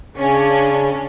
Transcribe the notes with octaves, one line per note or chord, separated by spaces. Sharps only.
C#3 C#4 D4